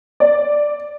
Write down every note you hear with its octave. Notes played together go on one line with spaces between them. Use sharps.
D5